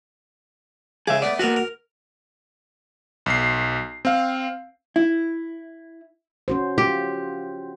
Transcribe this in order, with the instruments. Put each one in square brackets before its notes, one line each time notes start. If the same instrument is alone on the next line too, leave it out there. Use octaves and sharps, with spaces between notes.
[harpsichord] C#2 C#3 D6 [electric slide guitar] G#4 E5
[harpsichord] A3 B3 [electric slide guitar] D5
[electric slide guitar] A#3 F#4 [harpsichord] B3 A4 A#4
[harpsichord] A#4
[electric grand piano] B1 C7
C4 F5
[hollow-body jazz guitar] E4
[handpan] C#4 F#4 C5
[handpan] F4 [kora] G4